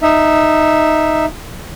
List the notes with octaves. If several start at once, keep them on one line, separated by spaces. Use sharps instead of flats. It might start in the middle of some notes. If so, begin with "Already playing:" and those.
D#4 E5